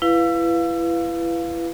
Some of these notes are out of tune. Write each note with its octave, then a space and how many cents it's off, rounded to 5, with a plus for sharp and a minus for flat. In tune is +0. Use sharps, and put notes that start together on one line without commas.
E4 +30 B4 +0 F5 +0